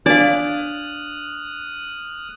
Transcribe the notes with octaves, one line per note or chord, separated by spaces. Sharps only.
D4 D5 F5 D#6 F6 F#6